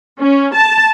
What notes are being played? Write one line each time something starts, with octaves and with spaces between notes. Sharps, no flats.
C#4
A5